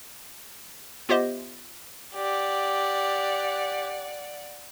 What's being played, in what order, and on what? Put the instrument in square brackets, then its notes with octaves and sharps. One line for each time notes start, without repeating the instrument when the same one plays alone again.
[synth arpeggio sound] B3 F4 G4 C5 D#5 E5
[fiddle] G4 [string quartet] D5 F#5